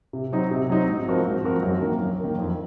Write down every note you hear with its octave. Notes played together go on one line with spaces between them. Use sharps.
C3
F#3 C4 D#4
C3
F#3 C4 D#4
G#2
F3 C4 F#4 A#4
G#2
F3 C4 F#4 A#4
F#2
D#3 A#3
F#2
D#3 A#3
F2